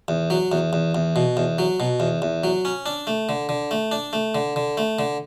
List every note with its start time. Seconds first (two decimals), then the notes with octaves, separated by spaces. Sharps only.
0.08 E2
0.30 F#3
0.52 E2
0.73 E2
0.95 E2
1.16 B2
1.37 E2
1.58 F#3
1.80 B2
2.00 E2
2.22 E2
2.44 F#3
2.65 C#4
2.86 D4
3.07 A3
3.29 D3
3.49 D3
3.71 A3
3.92 D4
4.13 A3
4.35 D3
4.56 D3
4.78 A3
4.99 D3